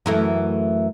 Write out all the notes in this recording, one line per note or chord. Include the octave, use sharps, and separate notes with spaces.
F#2 E3 A3